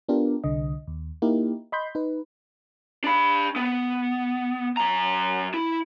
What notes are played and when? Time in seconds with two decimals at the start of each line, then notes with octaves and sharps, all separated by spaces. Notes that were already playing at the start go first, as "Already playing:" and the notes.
0.08 B3 D4 F4 G4 A#4
0.44 C2 D3 D#5
0.87 D#2
1.22 A#3 D#4 E4 G4 A#4
1.72 D#5 B5 C6 G6
1.95 D#4 B4
3.04 D4 B5
3.56 B3
4.77 F#2 A#5
5.54 E4